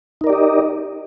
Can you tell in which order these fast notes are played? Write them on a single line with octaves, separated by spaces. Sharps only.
D#4 A#4 D5 G4 D#5